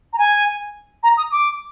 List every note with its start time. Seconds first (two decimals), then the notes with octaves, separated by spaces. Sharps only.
0.13 A#5
0.18 G#5
1.03 A#5
1.17 D#6
1.32 D6